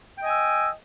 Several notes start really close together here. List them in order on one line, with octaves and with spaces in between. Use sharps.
G5 D#5 G#5 E6